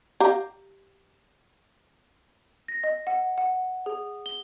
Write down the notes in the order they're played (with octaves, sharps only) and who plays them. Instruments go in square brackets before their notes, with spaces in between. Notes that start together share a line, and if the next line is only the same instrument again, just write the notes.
[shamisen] G4 F5 A#5
[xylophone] A#6
D#5
F#5
F#5
G#4
G7